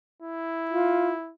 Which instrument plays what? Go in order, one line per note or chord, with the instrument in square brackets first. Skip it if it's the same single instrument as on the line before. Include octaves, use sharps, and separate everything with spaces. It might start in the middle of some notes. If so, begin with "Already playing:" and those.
[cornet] E4
[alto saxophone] F4